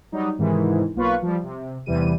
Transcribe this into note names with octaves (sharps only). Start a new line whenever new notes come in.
F#3 G3 D#4
G#2 C3 D#3 E3
B1 A#3 F4 B4 C#6
F3 G3
C3
E2 C3 E3 G3 D#7